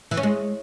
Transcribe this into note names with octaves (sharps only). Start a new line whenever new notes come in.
E3
C#4
G#3